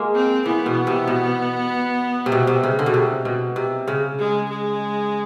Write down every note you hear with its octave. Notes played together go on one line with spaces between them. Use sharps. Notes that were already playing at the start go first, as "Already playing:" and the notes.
Already playing: G#3 A#3
C4
E3 B3
B2
C3
B2
C3
B2
C3
C#3
D3
B2
C3
B2
C3
C#3
G#3
G#3